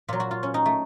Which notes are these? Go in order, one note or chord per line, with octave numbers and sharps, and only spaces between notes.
A#2 F#3 F4
F#4
F4
C#4
D#4
A3